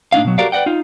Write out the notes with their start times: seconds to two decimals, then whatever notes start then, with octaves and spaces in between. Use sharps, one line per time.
0.12 A2 D4 D#4 F5
0.24 B2 F#3
0.38 F#4 G4 A4 A#4 D5 F5
0.52 B4 D5 D#5 F#5 G5
0.66 D#4 F4